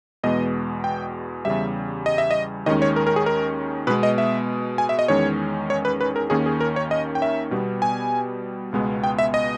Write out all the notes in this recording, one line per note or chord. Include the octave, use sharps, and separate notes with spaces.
E2 B2 G#3 B3 D#5
G5
E2 C#3 G3 E5
D#5
E5
D#5
D#2 D#3 G#3 C#4 D#5
C#5
A#4
A#4
G#4
A#4
B2 G#3 B3 B4
D#5
E5
G#5
E5
D#5
E2 D#3 G#3 C#4 C#5
C#5
B4
B4
A#4
D#2 D#3 A#3 C#4 G#4
G#4
A#4
C#5
D#5
G5
E5
B2 G3 B3
G#5
C#2 B2 G#3 B3
G5
E5
D#5